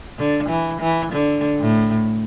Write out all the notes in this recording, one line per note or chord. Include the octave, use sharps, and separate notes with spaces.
D3
E3
E3
D3
A2